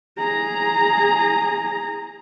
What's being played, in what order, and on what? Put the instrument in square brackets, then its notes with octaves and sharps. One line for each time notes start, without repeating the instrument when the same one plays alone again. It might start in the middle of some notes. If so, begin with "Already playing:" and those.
[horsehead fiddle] G#4 A#5